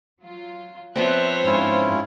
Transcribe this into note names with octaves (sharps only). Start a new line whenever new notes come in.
F#3 F4
F3 B3 C4 C5 C#5 E5 F#6
G#2 G#3 C#4 E4 F4 F5